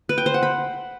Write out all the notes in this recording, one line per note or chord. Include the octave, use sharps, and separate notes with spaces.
B4
G5
C5
F#5
B5